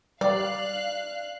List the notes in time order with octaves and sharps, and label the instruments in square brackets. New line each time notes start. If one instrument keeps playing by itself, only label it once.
[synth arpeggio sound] G3 [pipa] D5 [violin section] F5 F#6